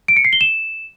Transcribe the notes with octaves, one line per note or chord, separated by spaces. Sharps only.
D7
C#7
C7
G7
E7